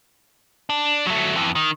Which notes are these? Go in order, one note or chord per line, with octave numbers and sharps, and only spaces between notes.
D4
F#3 A3
F2 E3
D#3